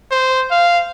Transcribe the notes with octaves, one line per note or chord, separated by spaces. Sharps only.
C5
F5